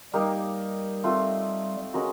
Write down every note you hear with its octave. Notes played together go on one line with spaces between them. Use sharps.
G3 A#3 D#4 G4 A#4
A3 C4 F4
G#3 C#4 F#4 A#4